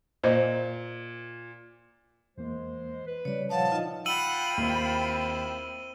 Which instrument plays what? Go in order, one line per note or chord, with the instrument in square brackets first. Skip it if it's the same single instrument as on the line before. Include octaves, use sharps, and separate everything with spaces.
[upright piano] A#2 [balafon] C5 D#5
[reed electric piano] E2 E3 A#3 [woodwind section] G#3 C5
[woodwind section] B4
[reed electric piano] C#3 G3 [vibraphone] C#5 D5
[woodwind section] A#2 F3 [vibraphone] C#5 F5 F#5 [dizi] A5
[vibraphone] D#4 F4 D#5
[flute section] F4 G5 B5 [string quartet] F#5 [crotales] E6 D#7 F#7
[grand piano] D#2 [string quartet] C4 E4